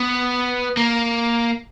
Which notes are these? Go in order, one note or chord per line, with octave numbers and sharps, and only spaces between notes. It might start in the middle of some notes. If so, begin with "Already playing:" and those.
Already playing: B3
A#3